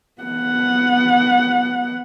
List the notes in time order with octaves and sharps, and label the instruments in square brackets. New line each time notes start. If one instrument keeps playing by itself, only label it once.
[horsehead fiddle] B3 F#5